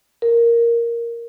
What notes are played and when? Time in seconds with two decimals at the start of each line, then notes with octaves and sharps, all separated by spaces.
0.22 A#4